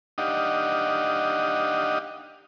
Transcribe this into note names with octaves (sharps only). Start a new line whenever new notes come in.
D4 D#4 G4 D#5 F5 F#5